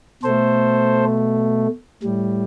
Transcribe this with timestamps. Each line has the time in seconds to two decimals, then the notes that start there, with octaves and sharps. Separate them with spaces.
0.23 B2 A3 A4 C5
2.03 A2 G3